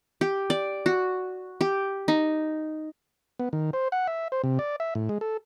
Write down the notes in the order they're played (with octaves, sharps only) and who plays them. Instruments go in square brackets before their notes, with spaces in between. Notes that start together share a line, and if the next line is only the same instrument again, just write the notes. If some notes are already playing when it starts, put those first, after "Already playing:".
[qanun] G4
D5
F#4
G4
D#4
[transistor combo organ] B3
D#3
C5
F#5
E5
C5
C3
D5
E5
A2
G#3
A4